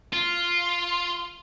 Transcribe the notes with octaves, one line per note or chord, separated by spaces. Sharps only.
F4